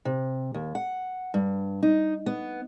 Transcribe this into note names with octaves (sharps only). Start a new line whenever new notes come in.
C3
D#2
F#5
G2
D#4
B3